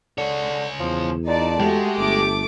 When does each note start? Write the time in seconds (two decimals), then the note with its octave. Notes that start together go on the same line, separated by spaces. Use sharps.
0.18 C#2 D3 C#5
0.80 E2 F3
1.27 A#2 D#4 D5 A5
1.60 G#3 A3 F#4 G4
1.98 G1 A3 D6